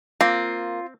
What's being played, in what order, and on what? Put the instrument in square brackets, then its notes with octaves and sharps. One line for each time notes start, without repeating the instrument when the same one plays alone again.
[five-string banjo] A#3 [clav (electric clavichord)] C4 [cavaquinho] F4